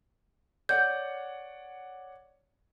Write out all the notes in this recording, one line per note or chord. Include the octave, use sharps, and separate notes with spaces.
C#5 D5 F#5 G6